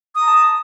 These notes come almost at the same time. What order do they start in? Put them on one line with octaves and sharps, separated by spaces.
D#6 A#5 A5